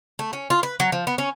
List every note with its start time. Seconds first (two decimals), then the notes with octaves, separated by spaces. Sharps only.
0.19 A3
0.33 C#4
0.50 F4
0.63 B4
0.80 F#3
0.92 F3
1.07 B3
1.18 C#4